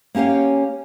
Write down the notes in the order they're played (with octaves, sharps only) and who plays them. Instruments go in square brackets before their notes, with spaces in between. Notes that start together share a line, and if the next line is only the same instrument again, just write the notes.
[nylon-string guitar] A#3 C#4 G4 C#5 F5